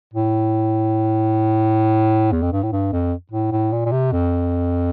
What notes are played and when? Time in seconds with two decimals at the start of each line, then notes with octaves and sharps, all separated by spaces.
0.14 A2
2.32 E2
2.42 F2
2.52 G2
2.63 A2
2.72 G2
2.92 F2
3.31 A2
3.52 A2
3.72 A#2
3.85 A#2
3.92 C3
4.12 F2